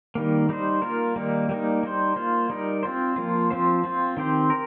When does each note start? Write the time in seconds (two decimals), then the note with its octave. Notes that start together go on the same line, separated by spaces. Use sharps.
0.15 D#3 G3 A#3
0.49 G3 D#4 C5
0.82 A#3 F4 A#4
1.16 D#3 G3 A#3 D#4
1.49 G3 A#3 D#4
1.83 G3 D#4 C5
2.16 A#3 F4 C5
2.49 G3 D#4 A#4
2.83 C4 F4 C5
3.16 F3 A#3 F4
3.51 F3 C4 F4 C5
3.84 C4 F4 C5
4.17 D#3 C4 G4 C5
4.50 A#4